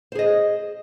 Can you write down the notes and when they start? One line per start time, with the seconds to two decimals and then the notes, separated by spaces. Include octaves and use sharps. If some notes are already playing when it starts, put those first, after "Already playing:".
0.12 C5
0.15 G#4
0.19 D#5